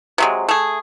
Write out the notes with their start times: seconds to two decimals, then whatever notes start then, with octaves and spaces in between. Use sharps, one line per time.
0.18 C3 F#3 G#3
0.48 A3 G#4